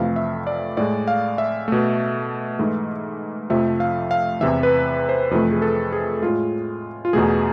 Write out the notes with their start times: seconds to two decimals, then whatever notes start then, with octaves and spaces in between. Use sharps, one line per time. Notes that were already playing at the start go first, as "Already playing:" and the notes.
Already playing: F2 C3 E3 A3 F5
0.16 E5
0.47 D5
0.77 A2 G#3 D5
1.08 F5
1.38 E5
1.68 B2 A3
2.59 G#2 E3 A3
3.50 F2 C3 F3 A3 E5
3.80 F5
4.11 F5
4.41 E2 C3 E3 E5
4.63 B4
5.09 C5
5.31 F2 C3 E3 A3 B4
5.51 G#4
5.62 A4
5.92 G#4
6.22 A2 G#3 F4
7.05 F4
7.13 E2 B2 A3 G#4